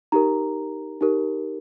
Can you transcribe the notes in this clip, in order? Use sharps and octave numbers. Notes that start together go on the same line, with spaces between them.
D#4 G4 A#4 A#5
D#4 G4 A#4